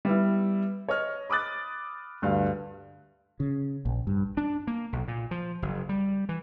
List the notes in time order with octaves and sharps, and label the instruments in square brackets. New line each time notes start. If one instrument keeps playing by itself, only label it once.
[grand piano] G3 B3 E4
C#5 D#5 F6
B5 D6 D#6 F#6 A6
D2 G2 F5
[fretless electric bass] C#3
A#1
G2
[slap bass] D4
A#3
B1
A#2
F3
F#1
G3
E3